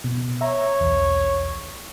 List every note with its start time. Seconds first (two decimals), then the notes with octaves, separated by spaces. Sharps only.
0.04 B2
0.41 C#5 E5 A#5
0.81 B1 E2